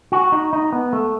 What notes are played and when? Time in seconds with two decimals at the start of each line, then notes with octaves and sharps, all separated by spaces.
0.12 F#4
0.32 D#4
0.53 D#4
0.72 B3
0.93 A3